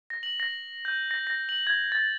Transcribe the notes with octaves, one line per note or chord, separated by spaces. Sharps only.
A#6
F#7
A#6
G6
A#6
A#6
F#7
G#6
A6